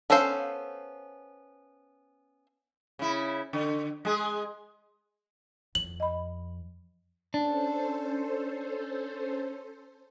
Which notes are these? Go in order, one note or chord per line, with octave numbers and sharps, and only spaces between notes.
B3 C#4 A4 C5 F5
C#3 E4
D3
G#3 G#4
F2 F#7
D#5 B5
C#4 D4 A4 C5